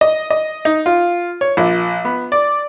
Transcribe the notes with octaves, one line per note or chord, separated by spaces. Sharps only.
D#5
D#5
D#4
F4
C#5
A#1
B3
D5